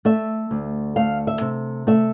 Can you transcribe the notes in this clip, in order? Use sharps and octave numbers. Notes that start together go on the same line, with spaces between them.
A3 E5
D2
A3 F5
E5
C3
A3 E5